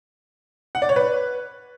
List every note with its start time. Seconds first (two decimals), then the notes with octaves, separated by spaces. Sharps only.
0.75 F#5
0.82 D5
0.89 C#5
0.96 B4